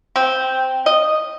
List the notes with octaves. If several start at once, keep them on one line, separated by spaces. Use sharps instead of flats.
C4
D#5